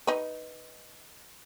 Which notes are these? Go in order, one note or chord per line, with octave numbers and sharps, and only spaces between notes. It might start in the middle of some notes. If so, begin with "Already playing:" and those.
D#4 B4